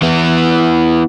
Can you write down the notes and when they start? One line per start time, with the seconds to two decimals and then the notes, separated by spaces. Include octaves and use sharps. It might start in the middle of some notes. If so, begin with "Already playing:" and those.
0.02 E3 B3